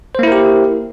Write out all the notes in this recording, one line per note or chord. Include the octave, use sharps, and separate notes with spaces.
A#3 E4 G4 A#4 C5